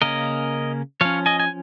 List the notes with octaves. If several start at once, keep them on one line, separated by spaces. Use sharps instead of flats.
C#3 A#3 C#4 A#4 D#5
F3 C#4 C#5 F5
D#5 G#5
G#5